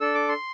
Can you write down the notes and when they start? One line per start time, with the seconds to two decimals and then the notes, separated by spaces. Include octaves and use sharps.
0.01 D4 A4 E6
0.15 D6
0.29 C6